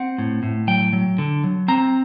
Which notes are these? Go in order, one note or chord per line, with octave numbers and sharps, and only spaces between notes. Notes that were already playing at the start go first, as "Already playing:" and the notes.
Already playing: C4 F#5
A2
A2
F#3 G5
F#3
D3
F#3
C4 A#5